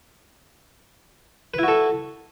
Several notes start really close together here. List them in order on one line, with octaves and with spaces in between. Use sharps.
B4 E4 F#4 A4